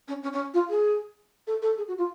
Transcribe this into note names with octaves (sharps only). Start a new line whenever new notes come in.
C#4
C#4
C#4
F4
G#4
A4
A4
G#4
F#4
F4